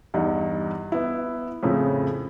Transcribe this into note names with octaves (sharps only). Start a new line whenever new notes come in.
E2 G2 D#4
B3 E4
F2 A2 C#3